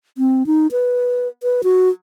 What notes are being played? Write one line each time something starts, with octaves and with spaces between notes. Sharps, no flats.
C4
D#4
B4
B4
F#4